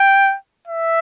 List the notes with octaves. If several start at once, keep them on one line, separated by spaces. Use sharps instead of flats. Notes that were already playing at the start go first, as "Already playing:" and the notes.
Already playing: G5
E5